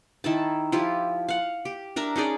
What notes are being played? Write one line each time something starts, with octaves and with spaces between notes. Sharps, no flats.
D#3 E4 A5
F3 E4 F4 G4
F5 F#5
G4
D4 A#4 E5 A#5
C#4 D#4 G#4 D5